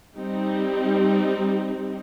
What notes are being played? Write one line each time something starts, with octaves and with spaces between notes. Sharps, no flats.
G3 C4 D#4 G4